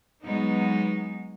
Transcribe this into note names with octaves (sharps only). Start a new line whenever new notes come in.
F#3 G#3 B3 D#4